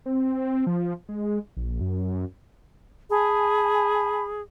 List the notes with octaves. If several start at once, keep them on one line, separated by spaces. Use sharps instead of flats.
C4
F3
G#3
A#1
F#2
G#4 G#5 A5 B5